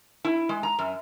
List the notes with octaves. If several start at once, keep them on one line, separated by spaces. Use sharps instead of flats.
E4
G#3
A#5
F#2